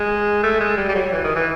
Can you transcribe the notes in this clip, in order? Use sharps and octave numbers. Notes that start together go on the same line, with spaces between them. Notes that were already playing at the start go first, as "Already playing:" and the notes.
Already playing: G#3
A3
G#3
G3
G3
F#3
E3
D#3
E3